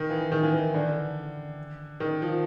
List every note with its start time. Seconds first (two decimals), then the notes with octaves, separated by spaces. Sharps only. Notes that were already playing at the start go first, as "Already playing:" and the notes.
Already playing: D#3
0.10 E3
0.32 D#3
0.43 E3
0.54 D#3
0.74 D3
2.00 D#3
2.22 F3